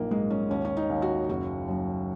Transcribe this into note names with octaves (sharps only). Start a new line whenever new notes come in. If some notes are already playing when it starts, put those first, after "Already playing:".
Already playing: A#1 F#2 A#3 D#4
G#2 G#3
C#4
D#2 C#4
C#4
D#4
D#2
F#4
F#1 F#4
F#2